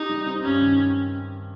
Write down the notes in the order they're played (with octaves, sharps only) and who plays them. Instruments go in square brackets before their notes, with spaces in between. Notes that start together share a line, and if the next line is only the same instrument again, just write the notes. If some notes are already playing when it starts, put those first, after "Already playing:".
Already playing: [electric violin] D#4 [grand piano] G4
[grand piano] G3
C4
[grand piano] G2 [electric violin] C#4
[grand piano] D#3